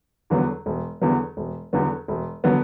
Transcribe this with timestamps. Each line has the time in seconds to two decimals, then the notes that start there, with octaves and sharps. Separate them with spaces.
0.30 E2 D3 F#3 B3
0.66 E1
1.01 E2 D3 F#3 B3
1.37 E1
1.73 E2 D3 F#3 B3
2.08 E1
2.44 D3 F#3 B3